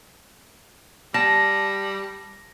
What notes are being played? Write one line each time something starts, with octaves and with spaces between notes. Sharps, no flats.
G3 A5 A#6